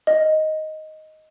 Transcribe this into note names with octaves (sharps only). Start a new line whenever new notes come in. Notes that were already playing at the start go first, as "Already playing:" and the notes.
D#5